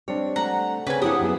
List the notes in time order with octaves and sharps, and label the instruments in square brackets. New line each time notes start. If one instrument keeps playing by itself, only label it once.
[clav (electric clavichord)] G3 C4 D4 [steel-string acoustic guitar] C#5
[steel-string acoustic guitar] A3 [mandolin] F#5 A#5
[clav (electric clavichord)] C#3 C4 C#4 [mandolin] B4 G#5
[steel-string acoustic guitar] D4 E4 F5 [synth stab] G4 F#5 [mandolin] D#6
[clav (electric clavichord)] F#2 B3 G#4